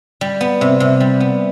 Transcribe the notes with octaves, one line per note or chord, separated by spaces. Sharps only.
G3
B3
C3
C3
G3
B3